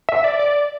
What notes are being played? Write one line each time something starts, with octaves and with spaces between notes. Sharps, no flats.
E5
D5
D5